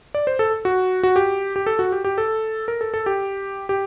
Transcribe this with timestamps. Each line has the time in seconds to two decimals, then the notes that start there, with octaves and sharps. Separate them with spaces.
0.14 D5
0.27 C5
0.39 A4
0.65 F#4
1.03 F#4
1.16 G4
1.56 G4
1.66 A4
1.79 F#4
1.92 G4
2.04 G4
2.18 A4
2.68 A#4
2.81 A4
2.94 A4
3.06 G4
3.69 G4